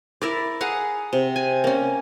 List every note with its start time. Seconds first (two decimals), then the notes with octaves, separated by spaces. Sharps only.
0.22 E4 A#4 D5
0.61 G#4 F5 F#5 A#5
1.13 C3
1.36 G#5
1.64 A#3 C#4